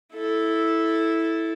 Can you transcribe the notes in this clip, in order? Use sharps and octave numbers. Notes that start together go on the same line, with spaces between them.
E4 A4